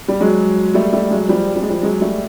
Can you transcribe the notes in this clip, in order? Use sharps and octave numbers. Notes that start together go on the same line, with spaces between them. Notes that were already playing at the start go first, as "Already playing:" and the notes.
G3
F#3 G#3
G3 A3
G3 A3
F#3 G#3
F3 G3
G3
G#3
F3 G3
F#3 G#3
G3 A3